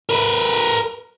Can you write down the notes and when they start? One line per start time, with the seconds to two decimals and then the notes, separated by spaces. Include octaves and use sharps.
0.09 A#4 B4